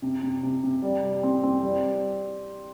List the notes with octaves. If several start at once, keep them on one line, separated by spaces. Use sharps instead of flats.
C3
C3
C3
C3
G3
G3
C4
C4
G3